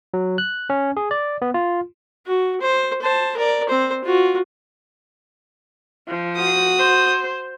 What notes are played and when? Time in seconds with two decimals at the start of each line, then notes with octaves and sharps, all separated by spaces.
0.14 F#3
0.38 F#6
0.70 C#4
0.97 G#4
1.11 D5
1.42 B3
1.54 F4
2.26 F#4
2.61 C5
3.01 C5 A5
3.37 A#4 D5
3.69 C4 C5
4.04 F4 F#4
6.08 F3
6.37 F#4 D#6
6.78 C5